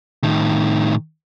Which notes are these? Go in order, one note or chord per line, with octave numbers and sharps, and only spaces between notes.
A2 D#3